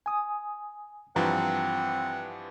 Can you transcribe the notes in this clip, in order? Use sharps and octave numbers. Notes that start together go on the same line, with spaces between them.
G#5 D#6
G2 E3 F3 C4 F#5 A#5